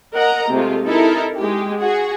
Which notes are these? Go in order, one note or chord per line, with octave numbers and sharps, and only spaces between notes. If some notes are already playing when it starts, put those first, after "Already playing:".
A#4 D#5 F#5 A#5
C3 G#3 A3 F4
D#4 E4 A4 A#4
G#3 G4
F#4 G#4